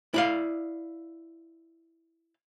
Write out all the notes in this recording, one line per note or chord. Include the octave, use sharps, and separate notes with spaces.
E4 D5 F5